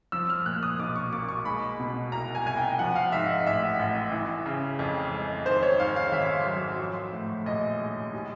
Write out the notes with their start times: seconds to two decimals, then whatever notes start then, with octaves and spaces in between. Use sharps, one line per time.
0.12 F3 E6
0.30 F6
0.46 A#2 F#6
0.63 D#6
0.79 B1 D6
0.96 C#6
1.13 A#3 D6
1.29 C#6
1.45 G#3 B5
1.80 B2
2.12 C2 A#5
2.35 G#5
2.45 C2 G#5
2.57 G5
2.79 F3 F#5
2.96 F5
3.12 G#2 E5
3.29 D#5
3.46 A1 E5
3.79 A1
4.12 E3
4.46 C#3
4.79 F2
5.13 G#3
5.46 D#3 C5
5.63 C#5
5.79 G#2 F5
5.96 F5
6.12 G#1 E5
6.46 F#3
6.79 F3
7.12 A2
7.46 A#1 D#5
7.80 G#3
8.13 G3